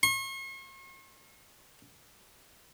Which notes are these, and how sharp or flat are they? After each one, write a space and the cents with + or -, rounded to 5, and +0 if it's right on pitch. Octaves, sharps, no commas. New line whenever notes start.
C#6 -45